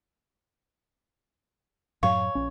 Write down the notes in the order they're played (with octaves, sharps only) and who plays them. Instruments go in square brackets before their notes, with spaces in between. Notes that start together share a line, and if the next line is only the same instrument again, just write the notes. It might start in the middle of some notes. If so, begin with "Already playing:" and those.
[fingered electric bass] F#2 A2 F#3 [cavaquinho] C#5 [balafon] F5
[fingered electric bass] A#1 C#4